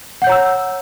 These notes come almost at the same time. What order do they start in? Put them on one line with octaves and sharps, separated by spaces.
F#5 G6 C#5 A#5 E6